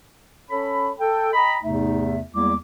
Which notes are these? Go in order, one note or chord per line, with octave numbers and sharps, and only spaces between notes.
C#4 A4 C#5 B5
A4 G5
D#5 G5 A#5 B5
E2 G#2 C3 A3 D#4 E5
E2 G3 G#3 A#3 E4 D6